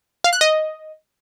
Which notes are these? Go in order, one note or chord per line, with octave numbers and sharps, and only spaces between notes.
F5
F#6
D#5